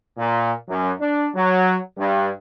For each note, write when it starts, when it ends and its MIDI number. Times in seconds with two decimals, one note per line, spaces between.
0.18 0.52 46
0.68 0.90 42
1.00 1.28 62
1.35 1.77 54
1.97 2.29 43